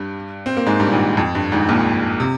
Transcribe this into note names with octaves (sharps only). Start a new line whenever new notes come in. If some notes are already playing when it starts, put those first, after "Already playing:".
Already playing: G2 G3
C4
A#3
G#2 G#3
G2 G3
A#2
G#1 G#2
F2
G2
G#1 G#2
A#1 A#2
C3